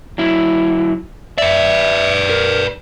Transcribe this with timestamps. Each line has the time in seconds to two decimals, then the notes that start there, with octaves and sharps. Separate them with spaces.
0.18 F#3 E4
1.38 B4 D5 E5
2.29 A#4